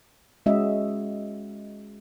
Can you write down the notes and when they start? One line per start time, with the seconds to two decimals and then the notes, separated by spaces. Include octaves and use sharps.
0.46 G#3 C#4 F#4 D#5 E5